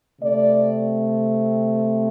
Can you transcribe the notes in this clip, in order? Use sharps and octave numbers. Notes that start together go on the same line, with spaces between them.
C3 A3 C4 D5